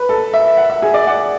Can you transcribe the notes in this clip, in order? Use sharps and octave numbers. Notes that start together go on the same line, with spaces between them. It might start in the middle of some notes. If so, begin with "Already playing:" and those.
Already playing: B4
A4
E5
F#5
E5
G#4
D5
F#5